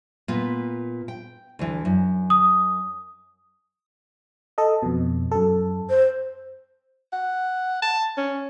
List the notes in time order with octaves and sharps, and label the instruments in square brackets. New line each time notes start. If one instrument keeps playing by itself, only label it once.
[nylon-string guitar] A#2 B3
G5
D2 E3
F#2
[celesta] D#6
[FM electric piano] A4 D#5
F2 B2
F#2 A4
[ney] C5
[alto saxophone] F#5
A5
C#4